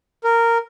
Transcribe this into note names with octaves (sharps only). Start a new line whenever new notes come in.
A#4